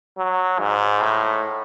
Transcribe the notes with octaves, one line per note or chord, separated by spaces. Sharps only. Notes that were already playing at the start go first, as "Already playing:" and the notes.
F#3
G#2
A2